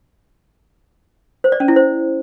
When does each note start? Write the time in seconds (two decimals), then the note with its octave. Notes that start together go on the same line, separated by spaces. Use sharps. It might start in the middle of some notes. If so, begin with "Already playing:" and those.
1.44 C5
1.52 D5
1.60 C#4
1.68 E4
1.76 C5